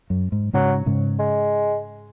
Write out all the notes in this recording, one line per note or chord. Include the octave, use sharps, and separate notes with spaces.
F#2
G#2
G#2 C#3 F#3
G#2 C#3
G#3